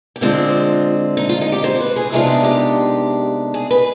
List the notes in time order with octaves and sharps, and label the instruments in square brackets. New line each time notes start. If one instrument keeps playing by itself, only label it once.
[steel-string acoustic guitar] G4
D3 G#3 C4 F4
D#4
F4
D#4
G4
C5
B4
G#4
C3 D#3 G#3 B3 D4 F4
G4
G4
G#4
B4